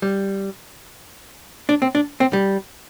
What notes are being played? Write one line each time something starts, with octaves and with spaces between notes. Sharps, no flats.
G3
D4
C4
D4
C4
G3